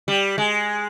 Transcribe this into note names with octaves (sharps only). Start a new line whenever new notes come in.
G3
G#3